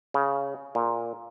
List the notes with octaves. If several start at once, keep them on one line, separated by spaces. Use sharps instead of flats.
C#3
A#2